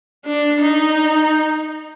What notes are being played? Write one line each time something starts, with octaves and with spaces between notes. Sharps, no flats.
D4
D#4